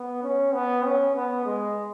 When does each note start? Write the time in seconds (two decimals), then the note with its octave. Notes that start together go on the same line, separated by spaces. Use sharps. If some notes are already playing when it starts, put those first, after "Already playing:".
Already playing: B3
0.23 C#4
0.54 B3
0.86 C#4
1.16 B3
1.46 G#3